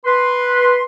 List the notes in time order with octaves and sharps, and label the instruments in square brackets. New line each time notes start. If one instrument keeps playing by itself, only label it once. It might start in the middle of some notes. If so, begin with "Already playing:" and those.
[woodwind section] B4 C6